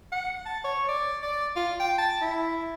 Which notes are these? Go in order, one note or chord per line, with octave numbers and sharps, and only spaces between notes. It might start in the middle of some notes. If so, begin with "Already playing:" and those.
F#5
A5
C#5
D5
D5
F4
G5
A5
E4